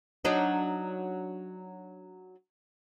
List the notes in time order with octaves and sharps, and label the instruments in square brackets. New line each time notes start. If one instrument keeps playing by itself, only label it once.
[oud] F#3 D4 D#4